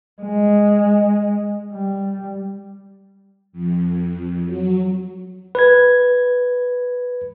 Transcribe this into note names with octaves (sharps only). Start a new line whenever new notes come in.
G#3
G3
F2
F#3
B4 G#6